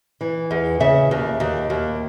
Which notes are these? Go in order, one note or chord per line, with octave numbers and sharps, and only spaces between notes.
E3
E2
C#3 E5
D#2
D#2
D#2